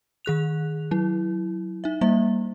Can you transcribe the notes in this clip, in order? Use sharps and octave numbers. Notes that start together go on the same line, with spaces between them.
D#3 G#4 F#6 F7
F#3 E4
D#4 E5
G3 A#3 E5